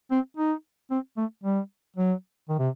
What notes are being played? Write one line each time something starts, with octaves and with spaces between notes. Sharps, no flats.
C4
D#4
C4
A3
G3
F#3
D#3
C3